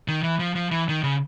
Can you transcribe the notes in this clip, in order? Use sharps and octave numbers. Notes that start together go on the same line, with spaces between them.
D#3
E3
F3
F3
E3
D#3
C#3